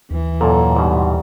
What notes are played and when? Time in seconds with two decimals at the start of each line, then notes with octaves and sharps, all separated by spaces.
0.11 D#2 E3
0.41 F#2 A#2 A4
0.77 G#2 B2 G3